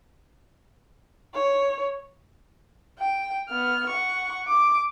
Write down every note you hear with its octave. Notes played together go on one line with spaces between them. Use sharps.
C#5
G5
B3 F6
F#5 C#6
D6